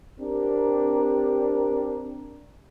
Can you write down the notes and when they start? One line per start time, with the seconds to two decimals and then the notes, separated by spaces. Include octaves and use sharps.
0.20 C4 D4 G4 A#4